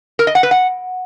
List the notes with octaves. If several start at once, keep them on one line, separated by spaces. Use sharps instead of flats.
A#4
D#5
F#5
B4
F#5